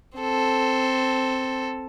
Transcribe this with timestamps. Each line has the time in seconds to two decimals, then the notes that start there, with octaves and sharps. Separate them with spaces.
0.18 C4 A4